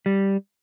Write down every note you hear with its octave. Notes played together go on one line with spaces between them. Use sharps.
G3